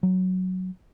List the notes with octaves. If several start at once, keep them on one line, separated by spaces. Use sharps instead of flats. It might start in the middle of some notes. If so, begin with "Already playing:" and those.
F#3